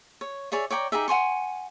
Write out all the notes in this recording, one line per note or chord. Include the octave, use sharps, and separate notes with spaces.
C#5
G#4 C#5 D5 E5
C#5 D5 G5 A#5
D#4 G4 G#4 E5
F#5 G#5 C6 C#6